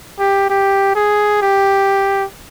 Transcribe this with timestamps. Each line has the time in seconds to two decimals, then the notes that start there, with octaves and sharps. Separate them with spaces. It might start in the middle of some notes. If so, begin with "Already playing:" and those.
0.19 G4
0.50 G4
0.96 G#4
1.42 G4